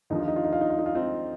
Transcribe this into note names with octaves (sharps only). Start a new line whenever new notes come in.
D#2 D3 F3 D#4
F4
D#4
F4
D#4
F4
D#4
F4
D#4
F4
C4 D#4